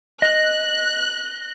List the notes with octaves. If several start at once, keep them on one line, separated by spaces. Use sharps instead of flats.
D#5 F#6